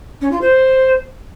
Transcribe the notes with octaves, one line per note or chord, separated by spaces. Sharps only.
C#4
F4
C5